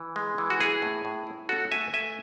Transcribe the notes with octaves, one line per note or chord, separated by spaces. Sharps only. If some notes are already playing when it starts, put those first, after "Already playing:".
Already playing: E3
G#3
E3
F#4
E4 G#4
A2
A2
E4
C#4 F#4 A4
A3 E5 G#5
A3 E5 G#5